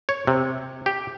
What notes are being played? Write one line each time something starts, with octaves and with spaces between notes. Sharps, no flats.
C#5
C3
G4